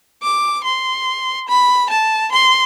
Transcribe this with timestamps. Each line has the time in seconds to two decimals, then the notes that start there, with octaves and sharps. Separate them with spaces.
0.23 D6
0.64 C6
1.49 B5
1.90 A5
2.32 C6